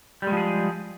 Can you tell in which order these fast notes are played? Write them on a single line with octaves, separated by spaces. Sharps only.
G3 G#3 F3 G#4